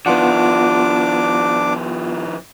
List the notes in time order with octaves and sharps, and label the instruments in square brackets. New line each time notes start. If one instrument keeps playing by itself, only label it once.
[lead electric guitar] D#3 F3 [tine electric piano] B3 F4 F#5 [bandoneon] D4 D6